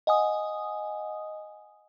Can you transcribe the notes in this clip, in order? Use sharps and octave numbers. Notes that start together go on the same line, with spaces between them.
D#5 F#5 G#5 D#6